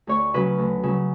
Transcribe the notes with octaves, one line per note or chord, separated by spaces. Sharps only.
D2 C#5 C#6
C#3 F#3 B4 B5
D2
C#3 F#3